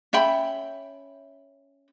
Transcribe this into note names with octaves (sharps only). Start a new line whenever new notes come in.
C#4 E5 G5 B5